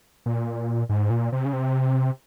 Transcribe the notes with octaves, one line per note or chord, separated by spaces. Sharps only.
A#2
G#2
A#2
C3
C#3
C3